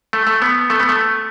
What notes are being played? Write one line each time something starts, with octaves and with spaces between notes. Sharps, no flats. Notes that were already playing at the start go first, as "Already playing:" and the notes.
A3
A3
B3
A3
B3
A3